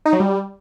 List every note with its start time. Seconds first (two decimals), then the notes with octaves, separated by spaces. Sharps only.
0.05 D#4
0.13 F#3
0.20 G3